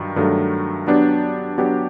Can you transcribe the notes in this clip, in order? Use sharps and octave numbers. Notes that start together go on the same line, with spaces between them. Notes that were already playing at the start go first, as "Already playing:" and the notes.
Already playing: G2 D#3 F#3
G2 D#3 F#3 A3
F#3 B3 D4 G4
F#3 B3 D4 G4